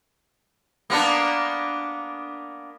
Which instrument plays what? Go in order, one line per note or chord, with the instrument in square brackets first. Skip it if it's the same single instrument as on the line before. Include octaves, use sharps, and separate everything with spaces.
[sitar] A#3 B3 D4